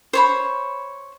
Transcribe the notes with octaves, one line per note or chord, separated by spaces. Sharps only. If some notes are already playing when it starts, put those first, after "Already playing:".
C5 C#5 B5